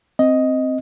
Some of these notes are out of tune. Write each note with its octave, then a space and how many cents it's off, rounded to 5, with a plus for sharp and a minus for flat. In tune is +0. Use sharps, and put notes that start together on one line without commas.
C4 +0 D#5 +5